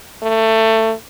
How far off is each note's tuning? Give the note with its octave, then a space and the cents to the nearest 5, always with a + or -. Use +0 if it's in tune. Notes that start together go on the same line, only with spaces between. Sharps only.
A3 +20